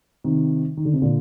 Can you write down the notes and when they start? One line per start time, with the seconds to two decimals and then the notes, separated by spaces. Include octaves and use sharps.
0.24 C3 D#3
0.77 D#3
0.85 D3
0.93 C3
1.02 A#2 D3